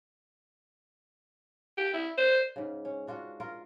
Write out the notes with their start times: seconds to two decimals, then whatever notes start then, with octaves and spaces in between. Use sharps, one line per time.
1.78 G4
1.93 E4
2.18 C5
2.56 G#2 C#3
2.85 C#4
3.07 D4 F4 F#4
3.40 F4 A#4